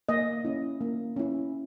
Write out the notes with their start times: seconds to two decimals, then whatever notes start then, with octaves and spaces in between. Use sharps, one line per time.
0.09 A#3 D#5
0.45 C#4 E4
0.81 A#3
1.16 C#4 E4